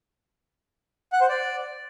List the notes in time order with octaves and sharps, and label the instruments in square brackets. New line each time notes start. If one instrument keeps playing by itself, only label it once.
[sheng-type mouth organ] F#5
C5
D5